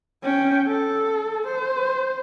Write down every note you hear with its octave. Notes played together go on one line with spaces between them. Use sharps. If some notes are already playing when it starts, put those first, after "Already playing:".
C#4 G5
A4
C5